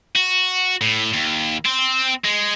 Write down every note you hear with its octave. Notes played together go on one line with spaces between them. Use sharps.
F#4
A2
D#2
C4
G#3